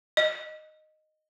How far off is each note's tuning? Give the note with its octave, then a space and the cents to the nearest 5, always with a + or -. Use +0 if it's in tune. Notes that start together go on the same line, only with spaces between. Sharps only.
D#5 -10